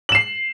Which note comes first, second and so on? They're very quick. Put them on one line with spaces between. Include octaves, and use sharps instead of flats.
F#7 E7 C7